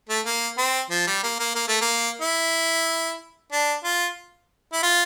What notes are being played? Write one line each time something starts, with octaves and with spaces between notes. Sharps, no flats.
A3
A#3
C4
F3
G3
A#3
A#3
A#3
A3
A#3
E4
D4
F4
E4
F4